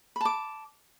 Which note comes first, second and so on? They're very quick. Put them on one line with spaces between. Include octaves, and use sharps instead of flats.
B5 A5 D6